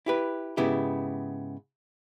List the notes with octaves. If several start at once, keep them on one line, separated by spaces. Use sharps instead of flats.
E4 G4 B4
G#2 C#3 B3 E4 G4